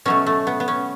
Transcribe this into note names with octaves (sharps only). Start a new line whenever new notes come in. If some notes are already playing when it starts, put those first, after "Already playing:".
B2 F#3 A3 C#4
A3
B3
B3
C#4